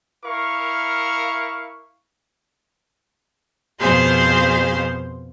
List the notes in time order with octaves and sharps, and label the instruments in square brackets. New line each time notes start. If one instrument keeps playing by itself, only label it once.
[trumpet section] E4 A#4 F5 C#6
[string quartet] F2 B2 G#4 C5 F5 C6